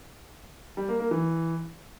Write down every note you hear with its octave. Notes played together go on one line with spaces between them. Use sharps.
G3
A#3
A#3
E3